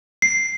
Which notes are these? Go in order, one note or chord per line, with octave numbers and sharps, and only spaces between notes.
C7